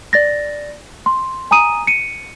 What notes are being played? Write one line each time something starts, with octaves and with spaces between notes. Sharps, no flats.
D5 A6 A#6
C6
G#5 A#5 D#6 D#7
C#7 D#7